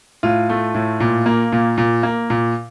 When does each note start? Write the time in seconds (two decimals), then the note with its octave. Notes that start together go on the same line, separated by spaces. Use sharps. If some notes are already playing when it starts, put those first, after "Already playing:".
0.23 A2 F4
0.50 A3
0.74 A2
1.00 A#2
1.26 A#3
1.52 A#2
1.78 A#2
2.03 A#3
2.30 A#2